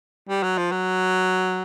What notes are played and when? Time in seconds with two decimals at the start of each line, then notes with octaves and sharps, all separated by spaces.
0.29 G3
0.43 F#3
0.58 F3
0.71 F#3